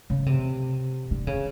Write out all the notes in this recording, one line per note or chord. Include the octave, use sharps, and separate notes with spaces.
C#3
C3
D3
C#3